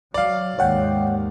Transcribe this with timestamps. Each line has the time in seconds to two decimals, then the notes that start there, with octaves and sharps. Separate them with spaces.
0.14 F#3 D5 F5
0.59 D#2 G#2 C#5 F#5 G5